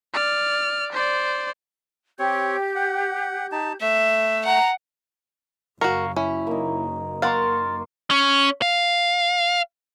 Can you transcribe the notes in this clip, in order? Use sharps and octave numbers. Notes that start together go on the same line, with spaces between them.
D5 F6
C5 D5
C4 G4 C#5 G6
F#5
D#4 A5
A3 E5
F#5 A#5
F#1 F#4 A#4 F5 A#5 C#6
C#4 E4
A#3 D#4
A#3 A#4 F5 F#5 C6 C#6 A6
C#4
F5